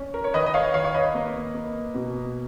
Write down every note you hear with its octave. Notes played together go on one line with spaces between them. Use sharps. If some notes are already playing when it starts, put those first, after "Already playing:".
Already playing: C#4
A#4
C#5
D#3 B4 D#5
D#5
C#5 F5
D#3 C#5 F5
C#5
B4 D#5
A#3
A#3
B2